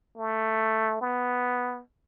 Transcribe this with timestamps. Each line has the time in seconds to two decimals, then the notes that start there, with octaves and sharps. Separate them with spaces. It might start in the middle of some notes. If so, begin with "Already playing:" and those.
0.17 A3
1.01 B3